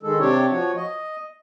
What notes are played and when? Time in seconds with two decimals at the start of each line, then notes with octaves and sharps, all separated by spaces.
0.03 D#3 G#3 A4
0.20 C3 C4 D4 G4 C#5
0.51 F3 F#4 C#5
0.76 D#5